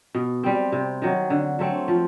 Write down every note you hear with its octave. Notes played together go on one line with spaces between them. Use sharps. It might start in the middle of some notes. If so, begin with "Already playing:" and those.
B2
G3 C4
C3
D#3 F#3
D3
F#3 A3 C4
F3